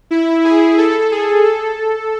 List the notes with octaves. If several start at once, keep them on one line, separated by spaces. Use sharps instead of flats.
E4
G#4
A4
G#4
A4